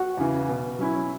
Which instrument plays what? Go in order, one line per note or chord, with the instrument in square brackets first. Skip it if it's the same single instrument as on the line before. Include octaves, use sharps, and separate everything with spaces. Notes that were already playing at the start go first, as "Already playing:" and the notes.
Already playing: [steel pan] F#4
[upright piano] E2 C#3 E3
B2
F#3 C#4 E4